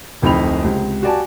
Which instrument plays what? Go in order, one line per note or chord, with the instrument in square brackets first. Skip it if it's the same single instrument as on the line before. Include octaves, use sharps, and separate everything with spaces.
[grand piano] D1 F2 D#4 G5 B5 F7
C#2 C3
F#4 G4 D5 G#5 A5